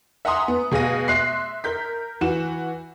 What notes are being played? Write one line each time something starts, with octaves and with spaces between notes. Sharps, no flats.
E5 F#5 G#5 A#5 C6 D#6
B3
B2 G#4 F5 A#6 D#7
E5 C6 F#6 C7
A#4 G6 B6
E3 F#4 E7